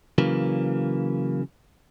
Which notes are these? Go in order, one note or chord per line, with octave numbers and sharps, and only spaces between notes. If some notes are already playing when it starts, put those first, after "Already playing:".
C#3 E3 F#3 A#3